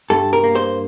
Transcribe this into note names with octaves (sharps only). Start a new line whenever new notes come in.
G2 A4
A#4
A#3
C5